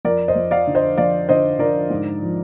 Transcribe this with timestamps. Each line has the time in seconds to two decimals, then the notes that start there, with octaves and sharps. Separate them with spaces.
0.05 F2 A#4 D5
0.28 C5 D#5
0.36 F2
0.51 D5 F5
0.67 D3
0.75 C5 D#5
0.97 F2 D5 F5
1.29 D3 C5 D#5
1.59 D3 A#4 D5
1.90 G#2
2.22 F3